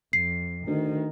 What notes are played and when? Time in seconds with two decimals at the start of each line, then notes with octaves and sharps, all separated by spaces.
0.13 F2 C7
0.67 D2 D#3